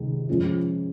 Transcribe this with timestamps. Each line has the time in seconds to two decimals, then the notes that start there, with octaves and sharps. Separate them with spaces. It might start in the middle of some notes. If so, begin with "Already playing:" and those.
Already playing: C#2 C3 D#3 G#3
0.29 C#2 C#3 F3